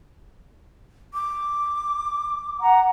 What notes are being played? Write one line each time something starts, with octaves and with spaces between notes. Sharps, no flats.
D6
F#5 A#5